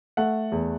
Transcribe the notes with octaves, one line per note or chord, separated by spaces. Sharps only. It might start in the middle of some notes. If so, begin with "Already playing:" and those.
A3 F#5
E2